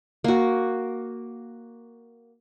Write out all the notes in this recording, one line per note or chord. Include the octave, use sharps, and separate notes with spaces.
A#3 F#4